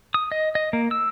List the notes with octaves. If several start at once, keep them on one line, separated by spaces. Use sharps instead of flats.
D#6
D#5
D#5
A#3
E6